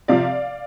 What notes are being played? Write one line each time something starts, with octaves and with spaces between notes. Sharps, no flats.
C3 F3 D5 F5